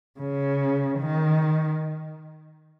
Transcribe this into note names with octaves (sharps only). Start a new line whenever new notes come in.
C#3
D#3